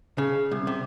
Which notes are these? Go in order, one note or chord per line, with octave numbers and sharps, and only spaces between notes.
C#3
C2
C3